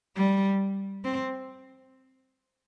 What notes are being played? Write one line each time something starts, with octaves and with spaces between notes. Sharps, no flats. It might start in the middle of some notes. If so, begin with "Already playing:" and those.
G3
C4